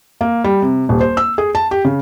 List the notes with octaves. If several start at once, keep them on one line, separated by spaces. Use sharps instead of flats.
A#3
G3
C3
D#1
C5
E6
G#4
A5
G4
C#3